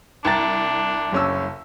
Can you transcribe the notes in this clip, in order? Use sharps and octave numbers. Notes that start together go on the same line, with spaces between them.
C2 D4 G5 A#5 A6
F#1 C#4 E6